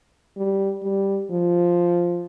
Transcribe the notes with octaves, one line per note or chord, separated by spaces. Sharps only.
G3
G3
F3